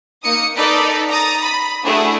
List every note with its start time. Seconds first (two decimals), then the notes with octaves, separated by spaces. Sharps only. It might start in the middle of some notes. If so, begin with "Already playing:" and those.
0.23 A#3 D#4 D#6 C#7
0.55 D#4 A4 B4 D5 B6
1.09 A#5 D#6 A6
1.42 B5
1.83 A3 D4 E4 F#4 G#4